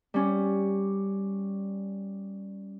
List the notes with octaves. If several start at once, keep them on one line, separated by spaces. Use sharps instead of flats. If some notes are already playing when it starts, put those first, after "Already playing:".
G3 C#4